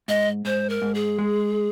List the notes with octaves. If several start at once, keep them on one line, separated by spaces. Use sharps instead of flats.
G#2 D#5
G#2 C5
A#4
G#2
G#4
G#3